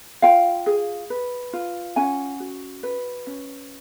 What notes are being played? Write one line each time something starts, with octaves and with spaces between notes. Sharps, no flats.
F4 F5 G5
G#4
B4
F4
C#4 F#5 G#5
F#4
B4
C#4